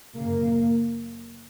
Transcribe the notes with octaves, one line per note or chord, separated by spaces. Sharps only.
F#2 C#3 A#3